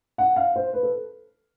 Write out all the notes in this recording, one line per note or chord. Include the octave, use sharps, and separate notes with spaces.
F#5
F5
C5
B4
A4